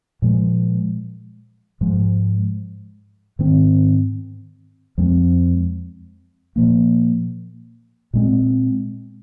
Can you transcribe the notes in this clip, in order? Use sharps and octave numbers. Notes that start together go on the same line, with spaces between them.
A#2 F3 G#3
G#2 F3 G#3
G#2 D#3 C4
F2 F3 G#3 C4
A#2 F3 A#3
A#2 G#3 C4